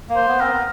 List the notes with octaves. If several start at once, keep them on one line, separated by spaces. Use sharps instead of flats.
A#3
C5
B3
C4 A#4
B3